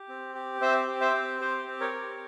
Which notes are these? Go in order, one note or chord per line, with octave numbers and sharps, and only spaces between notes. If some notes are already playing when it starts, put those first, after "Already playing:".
Already playing: G4
C4
G4
C4 C5 E5
G4
C5 E5
C4
G4 C5
C4
A#4 C#5
G4